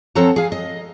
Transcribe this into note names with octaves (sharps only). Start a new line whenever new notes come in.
F3 C4 A4 C#5 F#5 A#5
G#4 F5 G#5
D#5